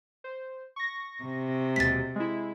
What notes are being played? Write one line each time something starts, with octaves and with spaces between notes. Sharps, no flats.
C5
C#6 A#6
C3
D#2 B2 G#3 A6 B6
G#3 E4